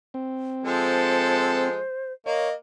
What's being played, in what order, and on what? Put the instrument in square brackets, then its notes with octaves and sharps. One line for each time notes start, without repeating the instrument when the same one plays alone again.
[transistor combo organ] C4
[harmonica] F3 G#3 A4 [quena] C5
[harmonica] A#3 [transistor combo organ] C#5 [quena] D#5